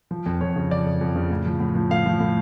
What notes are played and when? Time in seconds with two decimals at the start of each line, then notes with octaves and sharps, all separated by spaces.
0.11 F3
0.26 F2
0.41 F2 C#5
0.56 C#3
0.71 F3 D5
0.86 F2
1.01 F2
1.16 C#3
1.30 A2
1.46 F3
1.60 A2
1.75 F3
1.90 A2 F5
2.06 F3
2.20 A2